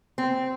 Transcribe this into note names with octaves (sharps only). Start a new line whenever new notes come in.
C4